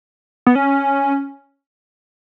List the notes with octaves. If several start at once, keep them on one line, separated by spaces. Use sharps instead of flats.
B3
C#4